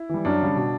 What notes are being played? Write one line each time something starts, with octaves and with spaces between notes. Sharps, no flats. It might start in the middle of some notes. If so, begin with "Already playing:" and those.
Already playing: E4
E3 G3
F#2 D4
C#3 G3
B2